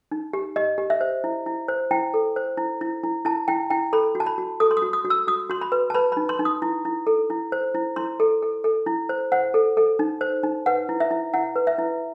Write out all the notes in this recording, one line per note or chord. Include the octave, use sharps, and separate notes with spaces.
D#4
G4
G4 D#5
G4
E5
C5
E4
E4
C5
E4 G5
A4
C5
E4
E4
E4
E4 A5
E4 G5
E4 G5
A4 B5
F#4
A5
B5
F#4
A4 D#6
C6
D#6
F#4
D#6
F#4
E6
F#4 D#6
F#4 C6
B5
B4
A5
B4 B5
D#4 B5
C6
D#4
D#6
E4
E4
A4
E4
C5
E4
E4 C6
A4
A4
A4
E4
C5
C5 F#5
A4
A4
D#4
C5
D#4
B4 F#5
E4
E5
E4
E4 F#5
B4
E5
E4